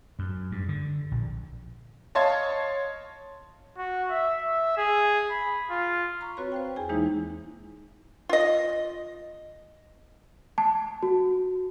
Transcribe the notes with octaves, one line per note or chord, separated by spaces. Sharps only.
F#2
G2
D3
A#1
C#5 D#5 F5 A5 C6 G#6
F#4
E5
E5
G#4
B5
F4
A#5 B5 C#6
C4 F#4 B4 C#5 B5
C5 F5 G5
E2 G#4 G5 G#5
E3 G#3 A#3 D#4 E4
F4 D#5
A5
F#4